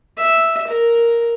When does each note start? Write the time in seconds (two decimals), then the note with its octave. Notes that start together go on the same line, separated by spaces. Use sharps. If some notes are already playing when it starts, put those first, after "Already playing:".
0.17 E5
0.67 A#4